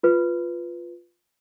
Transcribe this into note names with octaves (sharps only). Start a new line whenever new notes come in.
F4 B4